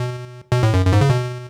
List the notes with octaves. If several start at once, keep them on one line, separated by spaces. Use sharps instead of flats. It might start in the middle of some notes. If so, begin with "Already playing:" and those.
Already playing: B2
B2
A2
F#2
F#2
G#2
C#3
B2